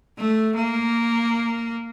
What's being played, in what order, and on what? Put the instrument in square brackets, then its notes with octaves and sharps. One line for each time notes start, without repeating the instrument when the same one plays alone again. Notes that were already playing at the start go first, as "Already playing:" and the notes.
[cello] A3
A#3